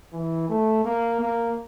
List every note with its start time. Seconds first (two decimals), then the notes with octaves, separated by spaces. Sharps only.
0.13 E3
0.49 A3
0.85 A#3
1.20 A#3